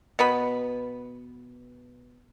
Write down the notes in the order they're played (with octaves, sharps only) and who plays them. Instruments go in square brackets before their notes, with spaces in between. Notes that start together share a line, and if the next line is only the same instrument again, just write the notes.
[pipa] B2 B3 B5